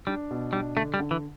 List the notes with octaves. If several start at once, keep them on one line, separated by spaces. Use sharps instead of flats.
G3 D4
B2
G3 D4
D3 A3
G3
D3
E3